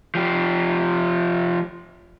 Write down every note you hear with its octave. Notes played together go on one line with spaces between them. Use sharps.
F3 G4